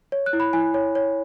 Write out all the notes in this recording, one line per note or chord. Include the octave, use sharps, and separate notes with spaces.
C#5
F#6
E4
B5
E4 G#5
C#5
C#5